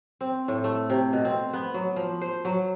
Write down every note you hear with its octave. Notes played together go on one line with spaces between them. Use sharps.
C4
A2
A3
C3
B2
C4
B3
F#3
F3
C5
F#3